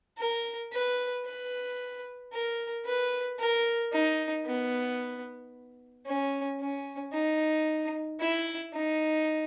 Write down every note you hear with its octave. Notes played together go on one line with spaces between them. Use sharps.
A#4
B4
B4
A#4
B4
A#4
D#4
B3
C#4
C#4
D#4
E4
D#4